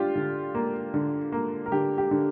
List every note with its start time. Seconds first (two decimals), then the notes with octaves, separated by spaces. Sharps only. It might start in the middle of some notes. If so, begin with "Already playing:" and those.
Already playing: D4 F4 G4
0.15 D3
0.55 A#3
0.94 D3
1.32 A#3
1.66 A#4
1.72 D3 G4
1.98 G4
2.11 D3